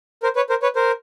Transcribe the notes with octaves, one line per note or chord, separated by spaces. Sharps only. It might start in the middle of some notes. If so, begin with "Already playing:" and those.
A#4 C5
B4 C#5
A#4 C5
B4 C#5
A#4 C5